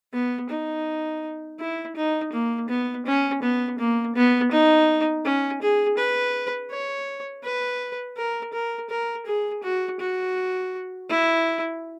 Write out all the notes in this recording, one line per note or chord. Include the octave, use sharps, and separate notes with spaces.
B3
D#4
E4
D#4
A#3
B3
C#4
B3
A#3
B3
D#4
C#4
G#4
B4
C#5
B4
A#4
A#4
A#4
G#4
F#4
F#4
E4